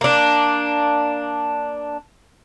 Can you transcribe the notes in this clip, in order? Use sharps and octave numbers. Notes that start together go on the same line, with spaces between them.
A#3 D4